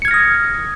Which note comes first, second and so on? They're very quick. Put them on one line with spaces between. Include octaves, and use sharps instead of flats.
C#7 G#6 F6 A#6 D#6